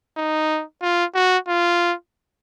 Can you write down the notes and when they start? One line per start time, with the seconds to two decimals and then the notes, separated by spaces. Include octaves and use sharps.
0.17 D#4
0.82 F4
1.15 F#4
1.48 F4